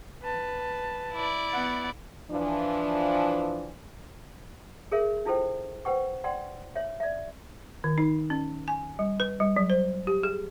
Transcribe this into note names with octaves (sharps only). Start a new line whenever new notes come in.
B4 A5
E4 D5
B3 F#5
E3 F3 D4
G#4 A#4 C#5 E5
D4 E4 F4 A4 C5 G5
B4 C5 F#5 G5 C#6
D5 F#5 G5 C6
C#5 E5
D5 E5
D#3
D#4
C#4
G#5
G3
B4
G3
F#3
C5
G4
G#4